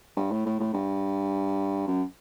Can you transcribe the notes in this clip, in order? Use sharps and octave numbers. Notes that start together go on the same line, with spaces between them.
G2
A2
A2
A2
G2
F#2